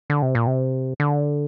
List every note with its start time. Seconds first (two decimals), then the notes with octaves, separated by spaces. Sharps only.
0.10 D3
0.22 C3
0.35 A#2
0.47 C3
1.00 D3